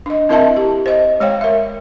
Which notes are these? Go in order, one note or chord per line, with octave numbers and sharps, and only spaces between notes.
D4 D#5
C4 E4 A#4 D#5 E5 A5
G4
C5 D#5
G#3 C#5 F5 G5
A#4 E5